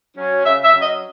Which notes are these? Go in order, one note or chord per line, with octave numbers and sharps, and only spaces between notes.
F#3 C#4
C#3 E5
E5
F#3 C#4
D#5